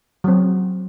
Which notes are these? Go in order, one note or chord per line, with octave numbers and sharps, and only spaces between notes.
F#3 C4